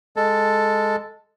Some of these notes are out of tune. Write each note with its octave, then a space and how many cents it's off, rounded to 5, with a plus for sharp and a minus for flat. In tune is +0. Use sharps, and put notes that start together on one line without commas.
G#3 +0 A4 +0